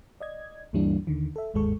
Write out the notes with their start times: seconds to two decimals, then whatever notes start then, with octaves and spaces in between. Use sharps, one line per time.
0.20 D5 D#5 G#6
0.73 D2 G2 E3 G3 A#3 D4
1.07 D#2 D3 D#3
1.36 A4 E5
1.54 G1 D#2 G#2 G#3 A4 C#6